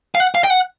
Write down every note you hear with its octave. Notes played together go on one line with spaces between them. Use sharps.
F5
F#5
F5
G5
F#5